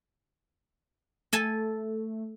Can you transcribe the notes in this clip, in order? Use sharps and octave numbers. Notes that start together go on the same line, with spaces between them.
A3 A4 G#5 A5